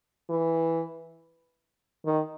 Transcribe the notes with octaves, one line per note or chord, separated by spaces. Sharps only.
E3
D#3